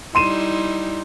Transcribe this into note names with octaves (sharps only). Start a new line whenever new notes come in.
G3 D#4 E4 C6 D#7 E7